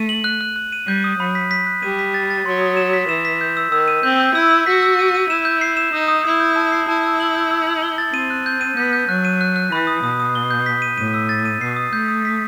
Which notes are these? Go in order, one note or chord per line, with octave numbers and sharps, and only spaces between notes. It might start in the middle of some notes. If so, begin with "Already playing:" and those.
Already playing: A3 D#7
F#7
F#6
F#6
F#6
D#7
G3 G6
D#6
F#3 B5
B6
B6
F#6
G3 D#7
B6
A6
A6
F#3 C6
D#6
E7
B6
E3 E7
B6
G6
E6
D#3 E6
D#7
C4 G6
G6
E4 E6
E6
F#4 B6
E6
D#7
D#7
E4 E7
G6
C7
E7
D#4 D#6
D#6
E4 D#6
G6
A5
C7
E4 A5
E6
F#7
G6
E6
F#7
G7
A6
C4 D#7
F#6
G6
D#7
B3 G6
G6
F#3 F#6
D#7
F#6
F#6
E3 B5
D#6
B2 D#6
D#6
G7
G6
B6
D#7
A2 D#7
E6
A6
D#7
B2 C7
D#6
A3 G6
D#6
B6